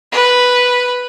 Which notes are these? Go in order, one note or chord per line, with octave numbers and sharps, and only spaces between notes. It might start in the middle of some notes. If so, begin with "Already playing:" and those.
B4